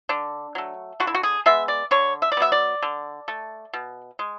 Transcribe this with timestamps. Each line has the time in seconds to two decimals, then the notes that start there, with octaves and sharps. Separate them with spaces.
0.09 D3 D4
0.55 F#3 A3
1.00 D3 F#4
1.07 E4
1.15 F#4
1.23 G#4
1.46 G#3 B3 E5
1.68 D5
1.91 D3 C#5
2.22 E5
2.32 D5
2.37 F#3 B3 E5
2.52 D5
2.83 D3
3.28 A3
3.73 B2
4.19 G#3